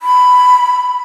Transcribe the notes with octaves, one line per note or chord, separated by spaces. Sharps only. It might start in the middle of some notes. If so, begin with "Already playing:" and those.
B5